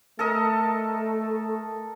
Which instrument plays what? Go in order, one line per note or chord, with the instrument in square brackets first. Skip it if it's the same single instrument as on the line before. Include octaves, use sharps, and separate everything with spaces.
[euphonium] A3 [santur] A4 A#4 D#5